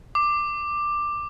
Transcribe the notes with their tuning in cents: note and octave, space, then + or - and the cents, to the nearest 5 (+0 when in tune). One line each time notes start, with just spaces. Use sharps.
D6 +10